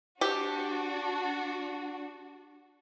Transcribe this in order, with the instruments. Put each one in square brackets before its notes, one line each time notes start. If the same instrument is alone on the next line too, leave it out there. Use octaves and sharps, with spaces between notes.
[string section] D4 F#4 [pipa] G4